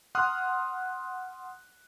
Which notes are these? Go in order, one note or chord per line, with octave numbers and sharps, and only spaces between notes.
F#5 C6 D#6 F6 F#6